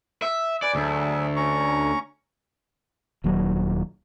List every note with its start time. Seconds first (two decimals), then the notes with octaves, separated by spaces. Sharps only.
0.22 E5
0.62 B4 D5 G#5
0.75 D2 F#3 G#4 E5
1.36 C#4 A#5 C#6
3.24 D#1 D#2 F#3